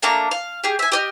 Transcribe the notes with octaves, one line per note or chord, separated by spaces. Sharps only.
A3 A#3 D4 A#5
F5
G4 G#4
E5 G#5
G4 D#5 F6